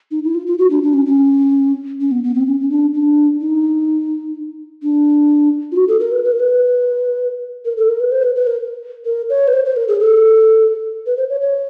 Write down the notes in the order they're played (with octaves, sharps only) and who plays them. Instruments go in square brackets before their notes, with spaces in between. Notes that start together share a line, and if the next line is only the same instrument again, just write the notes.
[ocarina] D#4
E4
F4
F4
F#4
D4
D4
C#4
C#4
C#4
B3
B3
C4
C#4
C#4
D4
D4
D#4
D4
F4
F#4
A4
A#4
B4
B4
A#4
B4
A#4
A4
A#4
B4
C5
B4
B4
A#4
A#4
C#5
B4
C5
C5
A#4
G#4
A4
B4
C5
C#5
C#5